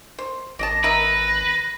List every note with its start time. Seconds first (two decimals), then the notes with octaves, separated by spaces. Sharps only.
0.19 C5
0.59 G#1 D5 D#5 A5 A#6
0.84 A#4 B4 D#5 E5